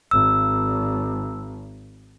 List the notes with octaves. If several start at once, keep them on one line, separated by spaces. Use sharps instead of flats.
G#1 E6